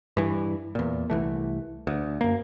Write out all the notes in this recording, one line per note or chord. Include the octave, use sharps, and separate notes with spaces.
G2 E3
E2 A#2
C2 E3 A3
D2
F#2 A#3